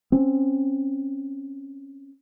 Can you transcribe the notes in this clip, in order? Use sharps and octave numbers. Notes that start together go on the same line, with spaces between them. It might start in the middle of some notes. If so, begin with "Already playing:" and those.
C4 C#4